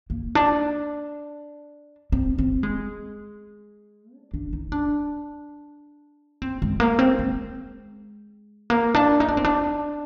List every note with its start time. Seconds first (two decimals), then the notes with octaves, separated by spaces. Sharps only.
0.10 A#3
0.35 D4
2.12 C4
2.38 C4
2.63 G#3
4.15 D4
4.34 D4
4.53 D#4
4.72 D4
6.42 C4
6.62 G#3
6.80 A#3
6.99 C4
7.19 G#3
8.70 A#3
8.95 D4
9.20 D#4
9.28 D4
9.37 C4
9.45 D4